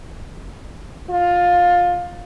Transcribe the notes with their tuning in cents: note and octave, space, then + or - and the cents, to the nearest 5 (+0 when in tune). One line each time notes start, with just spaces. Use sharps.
F4 +15